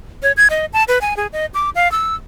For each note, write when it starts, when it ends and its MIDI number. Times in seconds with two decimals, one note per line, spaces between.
0.23 0.32 73
0.37 0.48 92
0.50 0.66 75
0.73 0.84 81
0.88 0.99 71
1.01 1.16 80
1.17 1.27 68
1.33 1.46 75
1.54 1.70 86
1.75 1.90 77
1.92 2.15 88